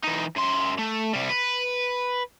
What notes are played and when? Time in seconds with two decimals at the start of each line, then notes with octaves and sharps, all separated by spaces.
0.04 E3 D#4
0.36 F#2 C6
0.78 A3
1.13 C3 G3
1.29 B4